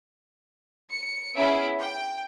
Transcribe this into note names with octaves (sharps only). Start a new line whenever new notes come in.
C#7
B3 C#4 E4 G#4 E5 D7
G5